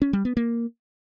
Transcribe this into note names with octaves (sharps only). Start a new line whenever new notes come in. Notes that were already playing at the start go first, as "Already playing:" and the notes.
C#4
G3
B3
A#3